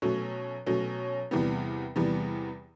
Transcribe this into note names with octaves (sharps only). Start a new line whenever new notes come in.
B2 F#3 A3 C#4
B2 F#3 A3 C#4
E2 C3 E3 G3 B3
E2 C3 E3 G3 B3